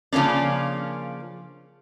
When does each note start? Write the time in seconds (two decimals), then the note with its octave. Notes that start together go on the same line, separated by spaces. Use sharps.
0.13 C#3 F3 A#3 C#4 D4